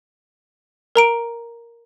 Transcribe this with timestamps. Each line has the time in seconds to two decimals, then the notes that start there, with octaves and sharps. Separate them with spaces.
0.96 A#4 A#5 D7